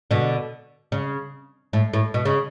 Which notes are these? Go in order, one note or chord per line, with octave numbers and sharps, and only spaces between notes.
B2 D3
C#3
A2
A2
B2
C#3